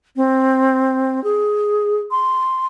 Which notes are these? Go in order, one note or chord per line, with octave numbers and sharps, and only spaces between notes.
C4
G#4
C6